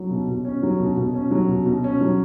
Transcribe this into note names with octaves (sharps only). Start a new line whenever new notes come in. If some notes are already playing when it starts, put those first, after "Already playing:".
Already playing: F#3
B2
B2
C#4
F#3
B2
B2
C#4
F#3
B2
B2
C#4
F#3